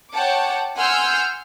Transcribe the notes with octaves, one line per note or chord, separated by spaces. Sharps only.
C#5 F#5 G5 A5 D6
F#5 G#5 C6 E6 F6 G6